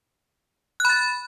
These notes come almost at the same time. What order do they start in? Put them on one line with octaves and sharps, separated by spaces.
F#6 B5 A6